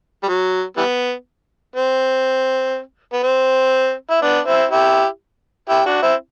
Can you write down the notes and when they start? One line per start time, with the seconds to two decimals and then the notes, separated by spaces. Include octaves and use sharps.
0.23 G3
0.28 F#3
0.77 E3 G3 B3
1.76 C4
3.13 B3
3.23 C4
4.10 E4
4.22 B3 D4
4.47 C4 E4
4.71 E4 G4
5.69 E4 G4
5.86 D4 F#4
6.02 C4 E4